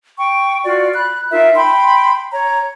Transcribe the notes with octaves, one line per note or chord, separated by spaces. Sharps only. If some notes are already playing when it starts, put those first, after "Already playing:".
G5 C#6
F4 F#4 D5
B5 F#6
D#4 F4 A#4 E5
G5 B5 C6
C#5 A#5